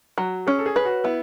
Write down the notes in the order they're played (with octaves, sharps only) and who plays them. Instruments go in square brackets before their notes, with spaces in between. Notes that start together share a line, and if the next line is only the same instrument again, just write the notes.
[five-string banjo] F#3 [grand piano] F#4
[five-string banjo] C#4 [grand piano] G#4
[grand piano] A4
G#4
[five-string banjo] B4
[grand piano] F#4
[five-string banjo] B3 [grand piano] E4